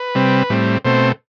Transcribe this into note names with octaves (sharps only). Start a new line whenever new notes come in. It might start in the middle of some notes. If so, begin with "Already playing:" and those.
Already playing: B4
C3 G3 C4
A2 G3 C4
B2 A3 C4 C5